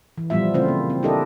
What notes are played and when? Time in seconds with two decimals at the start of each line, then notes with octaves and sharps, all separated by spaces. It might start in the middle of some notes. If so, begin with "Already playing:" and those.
0.18 E3
0.30 A#2 F3 G3 B3 F4 E5
0.54 C#3 A3 C4 E4 F4 C5
0.68 A#3
0.90 C4
1.03 D4 E4 G4 A4 A#4 D#5